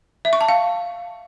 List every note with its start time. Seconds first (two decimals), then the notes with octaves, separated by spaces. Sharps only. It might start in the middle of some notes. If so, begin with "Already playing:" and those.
0.25 E5
0.33 C#6
0.41 A5
0.48 F5